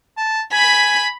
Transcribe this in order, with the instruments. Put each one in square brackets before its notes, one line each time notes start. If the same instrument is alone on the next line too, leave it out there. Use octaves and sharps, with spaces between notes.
[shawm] A5
[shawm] G#5 [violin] B5 B6